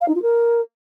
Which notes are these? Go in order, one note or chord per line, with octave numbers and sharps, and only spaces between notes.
F5
D#4
F4
A#4